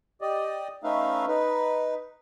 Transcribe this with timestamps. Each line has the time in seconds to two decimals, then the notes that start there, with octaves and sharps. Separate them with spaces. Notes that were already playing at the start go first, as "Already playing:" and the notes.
0.21 G4 D5 D#5
0.84 A3 C#4 D#4 B4 E5 F5
1.27 D#4 B4